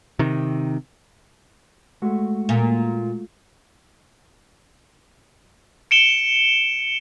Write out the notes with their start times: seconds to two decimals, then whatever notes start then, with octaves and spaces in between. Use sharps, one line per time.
0.19 C3 D#3
2.02 G#3 A3 F#4
2.49 A#2
5.91 C#7 D7 E7 G7